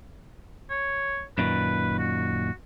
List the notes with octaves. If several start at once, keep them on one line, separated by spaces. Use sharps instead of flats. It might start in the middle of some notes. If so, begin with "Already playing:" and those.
C#5
F#2 A#2 D#3 B4
F#4